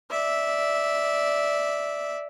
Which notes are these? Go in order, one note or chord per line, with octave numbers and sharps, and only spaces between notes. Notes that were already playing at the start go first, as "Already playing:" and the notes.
D5 E5